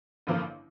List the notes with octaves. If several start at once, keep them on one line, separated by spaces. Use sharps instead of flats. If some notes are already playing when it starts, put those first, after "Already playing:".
A1 G2 D3 F3 A#3